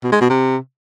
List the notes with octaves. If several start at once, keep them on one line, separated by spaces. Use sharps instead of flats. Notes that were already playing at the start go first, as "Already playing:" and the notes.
B2
G#3
B2
C3